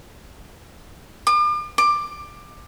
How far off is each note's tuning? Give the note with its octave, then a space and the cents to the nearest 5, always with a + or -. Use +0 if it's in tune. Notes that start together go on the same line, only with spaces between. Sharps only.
D6 +40
D6 +15